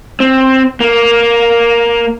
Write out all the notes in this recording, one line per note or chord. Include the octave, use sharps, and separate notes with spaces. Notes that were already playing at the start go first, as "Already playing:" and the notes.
C4
A#3